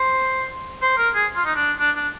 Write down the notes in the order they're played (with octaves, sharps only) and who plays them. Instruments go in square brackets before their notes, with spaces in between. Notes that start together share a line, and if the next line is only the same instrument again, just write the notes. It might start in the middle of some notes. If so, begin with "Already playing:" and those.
Already playing: [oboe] C5
C5
A#4
G#4
F4
D#4
D4
D4
D4